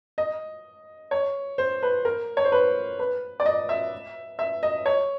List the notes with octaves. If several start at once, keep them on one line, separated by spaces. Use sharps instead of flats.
D#5
C#5
C5
B4
A#4
C#5
C5
B4
B4
D5
D#5
E5
E5
D#5
C#5